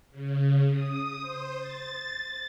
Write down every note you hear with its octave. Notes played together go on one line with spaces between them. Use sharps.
C#3
D#6
C5
A6